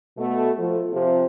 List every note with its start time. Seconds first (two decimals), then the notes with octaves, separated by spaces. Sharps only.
0.18 B2 A3
0.59 F3 A3
0.93 C3 F3